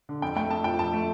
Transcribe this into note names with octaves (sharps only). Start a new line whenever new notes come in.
D3
F2 G5
A3 G5
F2 A5
F3 G5
F2 A5
A3